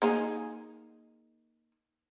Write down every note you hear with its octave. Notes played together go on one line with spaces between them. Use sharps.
A#3 D#4 G#4